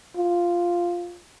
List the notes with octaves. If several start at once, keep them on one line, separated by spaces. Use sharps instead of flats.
F4